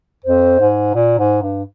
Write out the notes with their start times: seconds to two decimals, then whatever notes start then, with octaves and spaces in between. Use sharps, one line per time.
0.25 F2 C5
0.60 G#2
0.94 A#2
1.18 G#2
1.42 G2